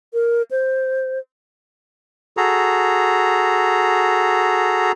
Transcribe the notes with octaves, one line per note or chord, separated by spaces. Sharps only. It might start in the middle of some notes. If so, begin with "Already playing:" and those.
A#4
C5
F#4 G#4 A4 A#5